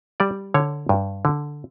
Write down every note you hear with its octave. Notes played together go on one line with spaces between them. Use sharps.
G3 D5
D3 C#5
G2
D3